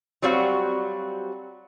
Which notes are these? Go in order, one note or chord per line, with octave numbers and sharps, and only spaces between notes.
F#3 G3 C4 F#4 F5